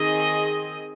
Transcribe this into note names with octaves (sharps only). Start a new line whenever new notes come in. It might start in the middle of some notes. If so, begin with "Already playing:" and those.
Already playing: D#3 C4 G#4 D#5